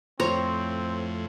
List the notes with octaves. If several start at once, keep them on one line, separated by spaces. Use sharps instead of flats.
F2 A2 C4 C5 C#5 A#5